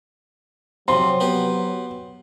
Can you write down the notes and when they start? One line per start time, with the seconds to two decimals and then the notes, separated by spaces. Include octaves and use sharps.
0.88 C3 F3 F#3 C6
1.20 B3 G4